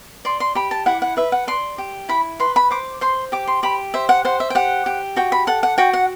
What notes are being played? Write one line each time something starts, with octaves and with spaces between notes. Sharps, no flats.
D5 C6
C6
G4 B5
A5
E4 F#5
F#5
B4 E5
F#5
D5 C6
G4
E4 B5
B4 C6
B5
C5 D6
C5 C6
G4 D6
C6
G4 B5
C5 E5
F#5
C5 F#5
E5
G5
G4 F#5
G4
F#4 G5
B5
A4 F#5
F#5
F#4 G5
F#5